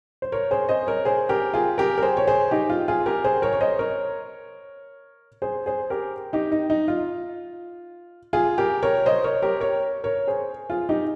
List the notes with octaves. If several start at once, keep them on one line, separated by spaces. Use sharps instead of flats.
C5
A#4 C#5
G#4 C5
C5 D#5
A#4 C#5
G#4 C5
G4 A#4
F4 G#4
G4 A#4
A#4
G#4 C5
C#5
G#4 C5
D#4 G4
F4
F4 G#4
G4 A#4
G#4 C5
A#4 C#5
C#5
C5 D#5
A#4 C#5
G#4 C5
G#4 C5
G4 A#4
D#4 G4
D#4
D#4
F4
F4 G#4
G4 A#4
A#4 C#5
C5 D#5
A#4 C#5
G4 A#4
A#4 C#5
A#4 C#5
G#4 C5
F4 G#4
D#4 G4